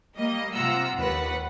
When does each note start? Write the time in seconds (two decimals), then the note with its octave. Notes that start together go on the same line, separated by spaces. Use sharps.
0.17 G3 A#3 D#5
0.54 C3 F4 F#5 A#5 E6
0.97 D#2 B4 F#5